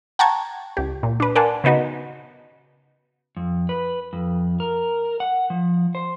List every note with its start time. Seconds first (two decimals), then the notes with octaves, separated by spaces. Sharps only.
0.19 F#5 G5 A5 A#5 C#6 G#6
0.77 C#2 G4
1.03 A#2
1.20 D4 B4
1.36 A#4 D5 F#5 G#5 A5 C6
1.64 C#3 B3 D#4 F#4 B4
3.37 F2
3.69 B4
4.13 F2
4.60 A#4
5.20 F#5
5.50 F3
5.95 C5